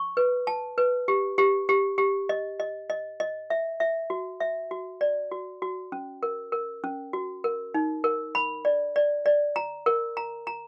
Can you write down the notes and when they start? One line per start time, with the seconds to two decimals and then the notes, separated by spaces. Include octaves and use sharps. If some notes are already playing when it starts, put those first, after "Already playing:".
Already playing: C#6
0.17 B4
0.47 A5
0.78 B4
1.08 G4
1.38 G4
1.69 G4
1.98 G4
2.29 D#5
2.60 D#5
2.90 D#5
3.20 D#5
3.50 E5
3.80 E5
4.10 F#4
4.40 E5
4.71 F#4
5.01 D5
5.31 F#4
5.62 F#4
5.92 C#4
6.23 A#4
6.52 A#4
6.84 C#4
7.13 F#4
7.44 A#4
7.74 D#4
8.04 A#4
8.35 B5
8.65 D5
8.96 D5
9.26 D5
9.56 A#5
9.86 A#4
10.17 A#5
10.47 A#5